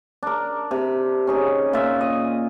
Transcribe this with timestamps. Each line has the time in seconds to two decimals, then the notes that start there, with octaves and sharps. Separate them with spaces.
0.23 D4 A#4
0.71 C3
1.27 C#4 D#4 G#4
1.73 A#2 F4 E5
2.01 D#5